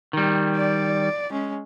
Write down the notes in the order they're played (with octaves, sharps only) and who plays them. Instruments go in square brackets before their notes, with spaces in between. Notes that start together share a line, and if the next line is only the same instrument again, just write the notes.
[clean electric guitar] D#3 G3
[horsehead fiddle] D5
G#3 C#4